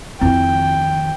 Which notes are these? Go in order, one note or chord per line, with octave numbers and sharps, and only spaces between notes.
F2 D#3 C4 E4 G5